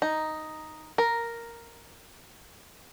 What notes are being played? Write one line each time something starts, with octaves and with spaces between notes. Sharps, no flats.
D#4
A#4